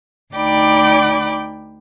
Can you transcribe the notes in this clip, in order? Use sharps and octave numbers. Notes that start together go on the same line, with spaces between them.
D2 D#4 D5 G5 B5 D6